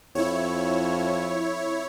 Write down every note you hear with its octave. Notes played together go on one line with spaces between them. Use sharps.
F2 E4 C#5